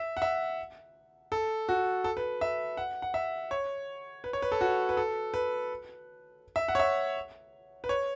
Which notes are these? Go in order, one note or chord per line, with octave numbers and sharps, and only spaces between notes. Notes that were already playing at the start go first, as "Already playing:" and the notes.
Already playing: E5
F#5
E5
A4
F#4
A4
B4
E5
F#5
F#5
E5
C#5
B4
C#5
B4
A4
F#4
B4
A4
B4
E5
F#5
C#5
E5
B4
C#5